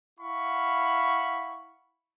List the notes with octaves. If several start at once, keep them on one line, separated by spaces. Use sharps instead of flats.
E4 F5 F#5 B5 C#6